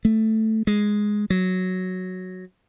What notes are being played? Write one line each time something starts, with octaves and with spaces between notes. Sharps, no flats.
A3
G#3
F#3